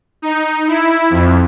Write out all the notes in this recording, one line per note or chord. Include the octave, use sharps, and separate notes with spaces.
D#4
E4
F2